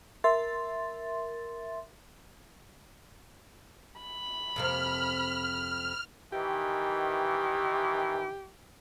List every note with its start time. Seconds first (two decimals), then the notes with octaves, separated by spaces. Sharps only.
0.24 A#4 E5 C6 A6
4.02 B5
4.56 F2 C3 A#3 F6
6.33 D#3 E3 G4